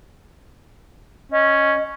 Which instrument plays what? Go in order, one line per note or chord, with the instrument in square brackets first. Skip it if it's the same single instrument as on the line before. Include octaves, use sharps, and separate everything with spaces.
[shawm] C#4 [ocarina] D#5